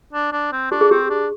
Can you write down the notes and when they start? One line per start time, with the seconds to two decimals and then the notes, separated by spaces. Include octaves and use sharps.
0.13 D4
0.32 D4
0.52 C4
0.71 D4 G4
0.81 G#4
0.91 C4 G4
1.10 D4